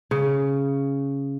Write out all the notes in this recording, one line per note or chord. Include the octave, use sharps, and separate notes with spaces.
C#3